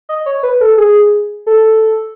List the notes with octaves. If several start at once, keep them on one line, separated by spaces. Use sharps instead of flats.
D#5
C#5
B4
A4
G#4
A4